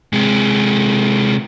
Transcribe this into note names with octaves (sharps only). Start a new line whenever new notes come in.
C3 G#3